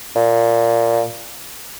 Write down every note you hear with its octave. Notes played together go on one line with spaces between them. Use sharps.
A#2